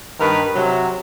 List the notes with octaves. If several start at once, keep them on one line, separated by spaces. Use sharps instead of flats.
G2 D#3 A#4 B4
C3 F#3